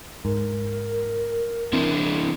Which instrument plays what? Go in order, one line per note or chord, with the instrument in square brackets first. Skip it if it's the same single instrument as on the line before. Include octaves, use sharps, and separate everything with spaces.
[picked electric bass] G#2 [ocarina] A#4
[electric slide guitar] E3 D4 E4 [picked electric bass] C4